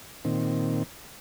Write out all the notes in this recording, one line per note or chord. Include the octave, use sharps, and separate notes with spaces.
A#2 D#3 C4